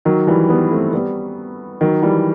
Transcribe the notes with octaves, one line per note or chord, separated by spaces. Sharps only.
D#3 F#3
E3 G3
G3 B3
A3 C4
G3 B3
D#3 F#3
E3 G3